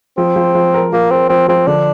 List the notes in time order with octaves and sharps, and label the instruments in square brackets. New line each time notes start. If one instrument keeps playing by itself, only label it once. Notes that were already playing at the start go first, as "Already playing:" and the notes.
[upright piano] F3 [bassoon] C4
[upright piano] F3
F3
A#4
[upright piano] F3 [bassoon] A#3
[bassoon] C4 [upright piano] A#4
[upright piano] F3 [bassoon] C4
[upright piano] F3 [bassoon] C4
[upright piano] D3 [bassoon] D4